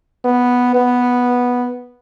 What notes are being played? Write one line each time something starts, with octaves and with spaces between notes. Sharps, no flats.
B3
B3